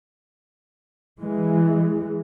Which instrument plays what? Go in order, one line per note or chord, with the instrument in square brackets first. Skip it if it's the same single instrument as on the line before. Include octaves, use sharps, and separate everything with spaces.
[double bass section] E3 G#3